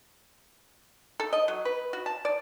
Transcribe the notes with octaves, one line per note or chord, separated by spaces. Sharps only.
A4
D#5
F#3
B4
F#4
A5
D5